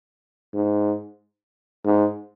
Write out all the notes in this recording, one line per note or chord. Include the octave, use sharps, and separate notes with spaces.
G#2
G#2